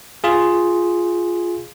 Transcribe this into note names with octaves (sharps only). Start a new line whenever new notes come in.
F4 G#4